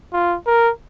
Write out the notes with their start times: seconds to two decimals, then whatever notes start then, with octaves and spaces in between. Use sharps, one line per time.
0.13 F4
0.47 A#4